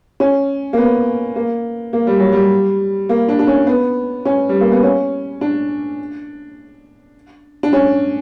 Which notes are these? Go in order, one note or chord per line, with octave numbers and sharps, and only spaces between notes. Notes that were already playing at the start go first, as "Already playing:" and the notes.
C#4
A#3
B3
A#3
A#3
G3
F#3
G3
A#3
D4
D4
C#4
B3
C#4
G3
A#3
B3
C#4
D4
D4
C#4